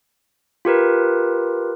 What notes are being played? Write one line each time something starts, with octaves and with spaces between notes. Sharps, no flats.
F4 G4 A#4 B4